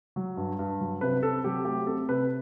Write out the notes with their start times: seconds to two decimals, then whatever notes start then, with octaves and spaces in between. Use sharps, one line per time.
0.16 F#3
0.37 G2
0.59 G2
0.80 F#3
1.01 C3 B4
1.22 C3 A4
1.44 F#3 G4
1.65 A3 G4
1.87 C4 A4
2.08 C3 B4